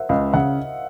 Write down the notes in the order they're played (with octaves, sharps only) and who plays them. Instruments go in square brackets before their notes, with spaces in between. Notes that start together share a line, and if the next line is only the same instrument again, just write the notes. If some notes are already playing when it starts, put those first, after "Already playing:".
Already playing: [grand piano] A#4 C5 E5 F#5
[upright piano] C#2 [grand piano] D#5 F5
[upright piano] C#3 [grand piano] E5 F#5